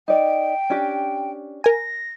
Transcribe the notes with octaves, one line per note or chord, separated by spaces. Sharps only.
D#4 D5 G5
C#4 D4 G4
A#4 G#5 A#6